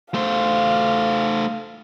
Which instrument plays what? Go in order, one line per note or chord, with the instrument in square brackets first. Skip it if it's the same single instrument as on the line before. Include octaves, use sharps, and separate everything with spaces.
[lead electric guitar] A3 C5 [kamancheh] F5